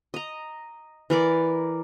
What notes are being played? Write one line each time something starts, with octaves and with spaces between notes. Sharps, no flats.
D#5 A#5
E3 A#4 D5